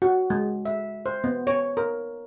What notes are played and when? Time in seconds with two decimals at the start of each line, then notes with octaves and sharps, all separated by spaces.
0.02 F#4
0.30 G#3
0.65 E5
1.06 C5
1.24 B3
1.47 C#5
1.77 A#4